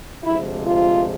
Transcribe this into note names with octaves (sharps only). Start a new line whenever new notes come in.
D2 C3 F3 G#3 E4
F4